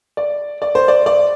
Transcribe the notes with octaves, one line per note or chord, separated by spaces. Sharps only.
D5
D5
C5
D5
D5